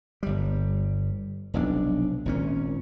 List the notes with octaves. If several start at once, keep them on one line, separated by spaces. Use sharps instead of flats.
G1 G3
F1 B1 C#4 D4
G#1 A#2 C#4